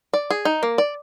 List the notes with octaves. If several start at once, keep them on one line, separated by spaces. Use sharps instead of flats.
D5
G#4
D#4
A#3
D5